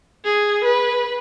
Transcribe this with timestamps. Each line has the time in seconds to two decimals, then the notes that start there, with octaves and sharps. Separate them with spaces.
0.24 G#4
0.64 B4